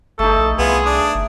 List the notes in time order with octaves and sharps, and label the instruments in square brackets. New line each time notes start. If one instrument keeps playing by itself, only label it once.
[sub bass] G1 [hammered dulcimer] A3 D#4 [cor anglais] A4
[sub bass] A#1
[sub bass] C2 [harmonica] B3 E4 F4 [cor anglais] G#4
[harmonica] D4 D#6
[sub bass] G1